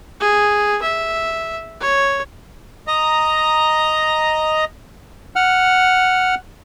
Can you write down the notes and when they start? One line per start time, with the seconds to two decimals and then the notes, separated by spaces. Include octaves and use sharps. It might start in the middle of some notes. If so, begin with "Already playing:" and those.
0.20 G#4
0.82 E5
1.81 C#5
2.88 D#5 A#5
5.36 F#5 F6